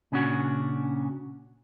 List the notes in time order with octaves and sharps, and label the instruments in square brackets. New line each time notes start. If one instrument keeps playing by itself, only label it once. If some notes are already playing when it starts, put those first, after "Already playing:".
[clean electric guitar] A#2 C#3 C#4 D4 F#4